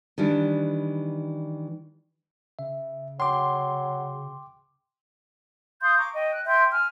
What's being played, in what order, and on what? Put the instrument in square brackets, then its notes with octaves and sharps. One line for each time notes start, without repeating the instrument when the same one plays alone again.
[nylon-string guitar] D#3 E3 G3 D4
[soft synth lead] C#3 [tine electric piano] E5
[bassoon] F#3 [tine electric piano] G5 D6 [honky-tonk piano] C6
[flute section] F5 C6 D#6 G6
A#5 C#6 D6
D#5 G5
F#6
E5 G5 C6 G6
G#5 F6